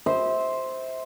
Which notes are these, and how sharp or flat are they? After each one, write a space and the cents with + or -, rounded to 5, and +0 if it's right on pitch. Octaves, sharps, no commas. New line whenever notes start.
C5 +0 E5 -25